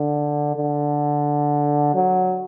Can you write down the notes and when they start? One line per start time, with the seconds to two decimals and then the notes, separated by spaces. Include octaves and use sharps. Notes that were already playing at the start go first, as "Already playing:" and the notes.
Already playing: D3
0.56 D3
1.94 F#3